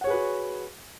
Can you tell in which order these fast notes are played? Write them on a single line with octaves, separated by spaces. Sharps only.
F#5 C#5 G#4 B4 F#4